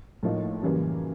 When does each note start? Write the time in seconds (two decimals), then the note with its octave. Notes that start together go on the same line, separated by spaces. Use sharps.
0.23 A2 F3 A#3 D#4
0.62 F#2 C#3 E3 G3 A#3